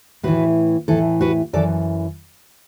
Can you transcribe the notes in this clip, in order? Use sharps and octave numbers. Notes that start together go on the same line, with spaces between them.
A2 E3 F#4 B4
A2 E3 E4 A4
F#4 B4
F#2 E3 A4 D5